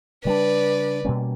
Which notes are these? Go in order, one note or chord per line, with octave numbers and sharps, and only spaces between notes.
C#3 G3 B3 D4 B4 D5
B2 G3 A#3 C#4